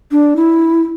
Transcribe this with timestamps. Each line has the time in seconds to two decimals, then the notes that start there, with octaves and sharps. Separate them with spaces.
0.12 D4
0.36 E4